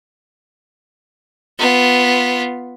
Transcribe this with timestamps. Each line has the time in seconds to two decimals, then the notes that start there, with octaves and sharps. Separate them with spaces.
1.58 B3 F4